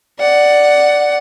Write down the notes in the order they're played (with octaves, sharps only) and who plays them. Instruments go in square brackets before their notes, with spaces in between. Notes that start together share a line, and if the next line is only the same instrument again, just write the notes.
[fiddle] D5 F#5